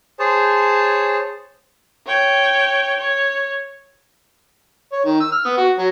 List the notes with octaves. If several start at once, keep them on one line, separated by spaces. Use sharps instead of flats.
G#4 C5 C#5 A5
C#5 G5
C#5
C#5
D#3
E6
F6
B3
F#4
F#3